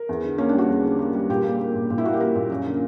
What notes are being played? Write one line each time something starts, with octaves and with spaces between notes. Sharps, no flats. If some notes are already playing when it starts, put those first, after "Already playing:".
Already playing: A#4
E2
D3
A#3 C#4
D4
G3
F#4
E2
D3
A#3
G3
A#2 G4
A#3
A#3
A#2
A#2
E4
A#3 F#4
G4
A#3 A#4
A#2
F#2
D3